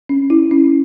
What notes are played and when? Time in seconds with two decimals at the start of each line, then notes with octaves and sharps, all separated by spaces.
0.09 C#4
0.30 E4
0.51 C#4